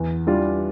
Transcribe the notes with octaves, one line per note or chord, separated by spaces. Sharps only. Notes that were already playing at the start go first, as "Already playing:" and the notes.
Already playing: E2
E3 G3 D4 F4